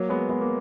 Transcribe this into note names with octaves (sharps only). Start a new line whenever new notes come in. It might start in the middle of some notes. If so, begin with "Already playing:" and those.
Already playing: F#3 A#3
G#3 B3
G#3 B3
A#3